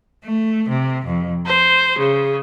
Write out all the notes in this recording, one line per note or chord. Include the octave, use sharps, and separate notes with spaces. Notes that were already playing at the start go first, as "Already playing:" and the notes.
A3
C3
F2
C5
C#3